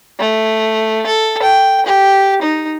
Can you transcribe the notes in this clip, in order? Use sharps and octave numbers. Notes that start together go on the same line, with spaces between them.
A3
A4
G5
G4
D#4